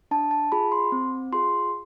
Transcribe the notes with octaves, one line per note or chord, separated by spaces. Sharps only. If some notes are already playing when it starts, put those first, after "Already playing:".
D4 A5
A5
F4 G#4 B5
C6
C4
F4 G#4 C6